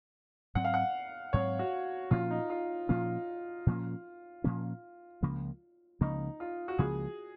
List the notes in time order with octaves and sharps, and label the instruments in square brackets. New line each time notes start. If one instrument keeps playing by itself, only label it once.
[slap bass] G#2 F#3 C4 [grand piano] F#5
[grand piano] F5
F#5
[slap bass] G#2 F#3 C4 [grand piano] C#5
[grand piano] F#4
[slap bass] A#2 F3 A#3 C#4 [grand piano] F4
[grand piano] D#4
F4
[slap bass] A#2 F3 A#3 C#4 [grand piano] F4
[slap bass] A#2 F3 A#3 C#4
A#2 F3 A#3 C#4
C#2 C#3 F3 A#3
[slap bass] C#2 C#3 F3 A#3 [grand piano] D#4
[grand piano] F4
F#4
[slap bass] C#2 C#3 F3 A#3 [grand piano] G#4